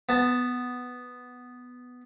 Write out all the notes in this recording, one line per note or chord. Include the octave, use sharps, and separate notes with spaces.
B3 A5